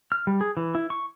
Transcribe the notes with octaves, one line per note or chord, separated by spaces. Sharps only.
F6
G3
G#4
E3
E4
C#6